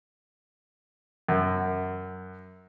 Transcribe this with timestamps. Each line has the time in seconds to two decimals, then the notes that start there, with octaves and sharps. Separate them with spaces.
1.29 F#2